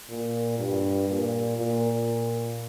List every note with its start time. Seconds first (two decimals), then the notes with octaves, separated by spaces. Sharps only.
0.10 A#2
0.59 G2
1.08 A#2
1.57 A#2